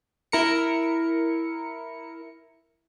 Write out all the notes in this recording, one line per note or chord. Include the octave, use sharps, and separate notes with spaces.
E4 A#4 C#7